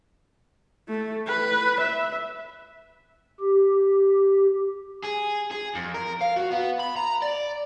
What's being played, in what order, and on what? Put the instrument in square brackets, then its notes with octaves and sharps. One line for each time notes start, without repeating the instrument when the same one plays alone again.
[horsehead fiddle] A3
B4
E5
[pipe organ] G4
[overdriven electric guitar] G#4
G#4
F2
A#4
F5
F#4
B3
B5
A#5
D5